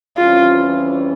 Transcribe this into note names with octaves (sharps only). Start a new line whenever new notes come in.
F2 E3 G3 C#4 F4